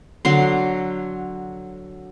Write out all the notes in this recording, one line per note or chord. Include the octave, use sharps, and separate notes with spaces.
D3 F#3 C6